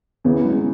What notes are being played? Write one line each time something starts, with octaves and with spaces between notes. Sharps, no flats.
E2 C#3 E3 B3
G#3